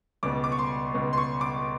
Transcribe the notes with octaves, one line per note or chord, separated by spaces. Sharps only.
C#2 B2 D6
D6
C#6
C6
C#2 B2
C6
C#6
D6